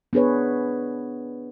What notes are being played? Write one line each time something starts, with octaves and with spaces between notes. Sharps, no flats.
B3 D4 G#4 B4 C#5